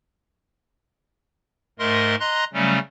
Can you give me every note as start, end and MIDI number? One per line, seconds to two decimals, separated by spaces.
1.79 2.15 44
1.79 2.15 57
1.79 2.15 70
1.79 2.15 75
1.79 2.15 84
2.20 2.44 75
2.20 2.44 82
2.20 2.44 84
2.20 2.44 90
2.54 2.79 49
2.54 2.79 54
2.54 2.79 55
2.54 2.79 57
2.54 2.79 61